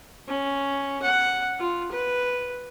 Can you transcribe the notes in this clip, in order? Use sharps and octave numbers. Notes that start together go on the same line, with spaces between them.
C#4
F#5
F4
B4